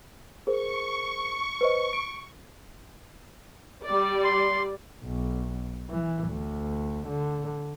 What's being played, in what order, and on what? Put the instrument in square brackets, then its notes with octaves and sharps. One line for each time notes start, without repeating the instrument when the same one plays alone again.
[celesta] G#4 A#4 C5 [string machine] C#6
[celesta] B4 C5 D#5
D7
[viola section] G3 D5
[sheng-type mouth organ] C6
[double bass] B1
E3
D2
D3